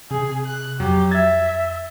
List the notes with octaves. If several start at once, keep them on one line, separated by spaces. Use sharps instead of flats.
C3 G#4
F#6
F2 F#3 G4
E5 G#6 A6